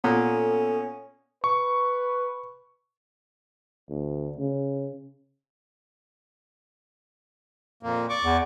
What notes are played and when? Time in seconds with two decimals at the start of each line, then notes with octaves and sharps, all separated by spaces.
0.04 A#2 B3 C#4 A4
1.44 B4 C#6
3.90 D2
4.37 C#3
7.83 F2 A#2 A#3
8.09 D5 C#6 D6
8.25 E2